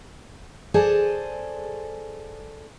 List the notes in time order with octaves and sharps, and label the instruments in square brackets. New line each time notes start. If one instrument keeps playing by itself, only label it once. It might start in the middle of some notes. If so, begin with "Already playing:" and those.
[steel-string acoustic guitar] G#4 A4 C5 D5 G#5 A5